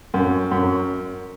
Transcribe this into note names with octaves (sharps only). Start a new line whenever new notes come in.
F#2
F#2